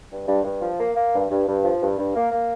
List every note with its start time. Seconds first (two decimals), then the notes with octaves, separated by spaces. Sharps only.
0.11 G2
0.27 G2
0.44 G2
0.61 F3
0.78 A#3
0.96 A#3
1.13 G2
1.30 G2
1.47 G2
1.63 F3
1.81 G2
1.97 G2
2.16 A#3
2.32 A#3